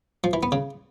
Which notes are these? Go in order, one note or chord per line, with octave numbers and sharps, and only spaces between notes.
F3
E3
B3
C#3